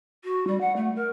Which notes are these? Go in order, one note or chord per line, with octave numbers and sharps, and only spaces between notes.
F#4
G3
F#5
A3
A#4